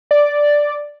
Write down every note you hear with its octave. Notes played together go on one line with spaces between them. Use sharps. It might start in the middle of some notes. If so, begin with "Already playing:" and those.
D5